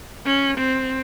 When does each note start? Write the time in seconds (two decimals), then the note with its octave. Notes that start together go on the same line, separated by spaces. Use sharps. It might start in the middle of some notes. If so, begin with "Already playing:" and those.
0.25 C#4
0.57 C4